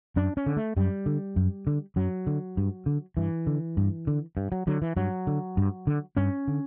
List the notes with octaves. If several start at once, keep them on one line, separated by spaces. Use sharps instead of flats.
F#2 D4
C#4
D3
A3
F#2 G3
D3
F#2
D3
F#2 F#3
D3
G2
D3
G2 E3
D3
G2
D3
G2
F#3
D3 F#3
E3
G2 F#3
D3
G2
D3
G2 C#4
D3